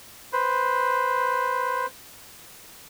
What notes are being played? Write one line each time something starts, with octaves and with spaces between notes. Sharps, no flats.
B4 C5